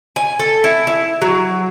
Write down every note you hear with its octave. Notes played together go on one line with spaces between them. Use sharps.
G#5
A4
E4
E4
F#3